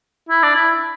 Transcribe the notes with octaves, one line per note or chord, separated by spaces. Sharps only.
E4
D4
E4